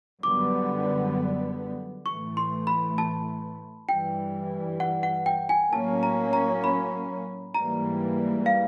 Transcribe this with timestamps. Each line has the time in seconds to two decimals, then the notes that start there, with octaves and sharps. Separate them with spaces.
0.23 F#2 D3 G3 B3 D6
2.06 A2 E3 A3 C#6
2.37 C6
2.67 B5
2.98 A5
3.89 G2 E3 G3 G5
4.80 F#5
5.03 F#5
5.26 G5
5.49 G#5
5.72 A2 F#3 A#3 C#4 A5
6.03 A#5
6.33 A#5
6.64 B5
7.55 G#2 E3 G3 A#3 A#5
8.46 F5